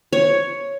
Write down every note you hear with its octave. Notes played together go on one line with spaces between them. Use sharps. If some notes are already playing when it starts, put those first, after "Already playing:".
C#5